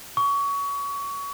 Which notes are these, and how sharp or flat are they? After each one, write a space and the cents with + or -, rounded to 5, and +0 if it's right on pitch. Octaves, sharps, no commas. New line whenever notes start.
C#6 +25